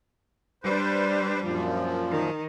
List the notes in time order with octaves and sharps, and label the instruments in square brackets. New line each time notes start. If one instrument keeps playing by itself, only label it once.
[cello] G3 D4 [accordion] B4 C5
[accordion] F#2 A#2 F3
[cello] D#3